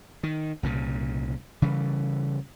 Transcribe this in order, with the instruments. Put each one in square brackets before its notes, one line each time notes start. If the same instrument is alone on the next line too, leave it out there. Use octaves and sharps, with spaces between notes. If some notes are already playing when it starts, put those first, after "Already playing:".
[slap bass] D#3
C2 A#2 C#3
C#3 E3 G3